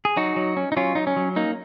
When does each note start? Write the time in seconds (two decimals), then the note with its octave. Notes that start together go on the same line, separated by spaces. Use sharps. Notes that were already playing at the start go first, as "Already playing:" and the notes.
0.05 G#4
0.16 F#3 D#4 F#4
0.36 F#3
0.57 C#4
0.72 D#4
0.77 F#3 C#4 F4
0.95 F#3 D#4
1.07 C#4
1.16 F#3
1.36 A#3 D#4